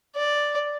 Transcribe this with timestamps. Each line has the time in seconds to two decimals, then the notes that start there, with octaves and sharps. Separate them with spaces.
0.15 D5